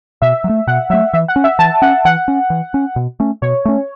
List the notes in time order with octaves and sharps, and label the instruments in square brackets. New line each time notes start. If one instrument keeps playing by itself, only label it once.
[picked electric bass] B2 [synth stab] E5
[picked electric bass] F#3
A3
[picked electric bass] B2 [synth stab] F#5
[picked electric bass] F#3 [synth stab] E5
[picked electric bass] A3
[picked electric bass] E3 [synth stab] E5
[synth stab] F#5
[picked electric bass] C#4
[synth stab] E5
[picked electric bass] E3 [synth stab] A5
[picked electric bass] C#4 [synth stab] F#5
[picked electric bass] E3 [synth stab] F#5
[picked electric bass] C#4
E3
C#4
B2
A3 C#4
[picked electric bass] B2 [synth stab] C#5
[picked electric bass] A3 C#4